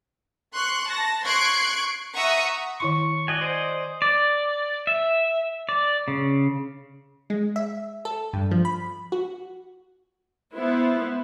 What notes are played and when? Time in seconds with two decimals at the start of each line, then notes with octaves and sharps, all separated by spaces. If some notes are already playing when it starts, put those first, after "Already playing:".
0.54 C6 C#6 F#6
0.89 A5 A#6
1.24 C6 C#6 F#6 G#6 C7 D7
2.15 E5 F#5 A#5 C#6 D#6
2.80 D#3 E4 C6 C#6
3.28 F#4 D5 D#5 G#5
3.41 C5
4.02 D5
4.87 E5
5.69 D5
6.08 C#3
7.30 G#3
7.56 E5
8.05 A4
8.33 G2
8.51 F3
8.65 B5
9.12 F#4
10.55 B3 E4 B4 C5